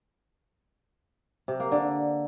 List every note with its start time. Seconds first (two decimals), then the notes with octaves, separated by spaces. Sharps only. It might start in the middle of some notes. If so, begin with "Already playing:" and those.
1.48 C3
1.60 A#3
1.72 D3